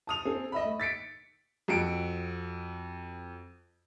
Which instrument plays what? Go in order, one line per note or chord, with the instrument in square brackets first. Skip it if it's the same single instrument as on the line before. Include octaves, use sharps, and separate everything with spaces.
[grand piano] A5 D#6 F7
C4 G#4 A4
D#5 E5 B5
A3
A6 B6 C#7 D7
[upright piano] F2 F#4 C#7 D7